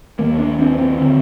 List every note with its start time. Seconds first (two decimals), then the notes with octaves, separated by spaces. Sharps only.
0.19 D#2 A#3
0.39 D4
0.58 D#2 C4
0.78 C4
0.97 D3 C4